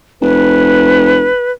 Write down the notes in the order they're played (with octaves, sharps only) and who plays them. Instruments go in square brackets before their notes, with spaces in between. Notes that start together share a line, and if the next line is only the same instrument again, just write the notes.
[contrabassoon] F1 [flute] B4